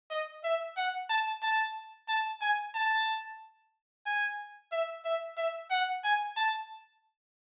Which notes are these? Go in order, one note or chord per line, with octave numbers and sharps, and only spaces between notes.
D#5
E5
F#5
A5
A5
A5
G#5
A5
G#5
E5
E5
E5
F#5
G#5
A5